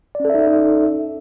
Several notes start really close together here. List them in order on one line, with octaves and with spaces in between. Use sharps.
D5 C#4 A4 E5 D#4